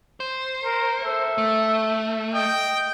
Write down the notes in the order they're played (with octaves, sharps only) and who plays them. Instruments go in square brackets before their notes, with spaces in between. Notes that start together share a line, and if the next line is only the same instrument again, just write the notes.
[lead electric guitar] C5
[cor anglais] A#4
[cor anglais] A4 [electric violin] E5
[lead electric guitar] A3
[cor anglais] D#5 [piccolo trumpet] G5